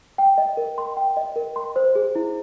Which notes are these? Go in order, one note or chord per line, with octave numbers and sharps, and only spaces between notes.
G5
D#5
A#4
C6
G5
D#5
A#4
C6
C5
G#4
E4